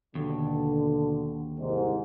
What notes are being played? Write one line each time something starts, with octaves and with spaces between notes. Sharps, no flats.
D#2 B2 D3
C2 G#2